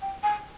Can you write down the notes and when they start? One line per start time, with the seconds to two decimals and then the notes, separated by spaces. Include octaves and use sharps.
0.02 G5
0.23 G#5